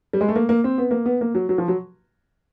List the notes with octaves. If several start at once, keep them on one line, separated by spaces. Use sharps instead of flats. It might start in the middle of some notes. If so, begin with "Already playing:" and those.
G3
G#3
A3
A#3
A#3
C4
B3
A#3
B3
A#3
F#3
F#3
F3
F#3